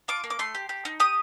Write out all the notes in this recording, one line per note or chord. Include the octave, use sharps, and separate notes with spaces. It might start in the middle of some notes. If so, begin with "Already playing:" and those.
F4 D6
A#3
D6
A3 C6
G4
G4
D#4
G4 D#6